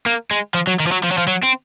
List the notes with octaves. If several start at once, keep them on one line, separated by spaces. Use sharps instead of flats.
A#3
G#3
F3
F#3
D#3
F3
F#3
F3
F#3
F3
F#3
C4